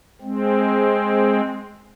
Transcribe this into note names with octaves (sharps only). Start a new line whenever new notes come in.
G#3 C4